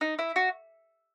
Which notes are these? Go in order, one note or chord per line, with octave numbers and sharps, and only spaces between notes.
D#4
E4
F#4